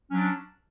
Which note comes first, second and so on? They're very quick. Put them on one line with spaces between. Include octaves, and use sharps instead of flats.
C#4 F#3 D4